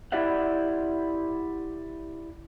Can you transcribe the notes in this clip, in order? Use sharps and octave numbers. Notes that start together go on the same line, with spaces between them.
E4 G4 D5 E5 F#5